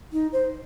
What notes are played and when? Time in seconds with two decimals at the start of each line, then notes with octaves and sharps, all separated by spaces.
0.12 D#4
0.32 C5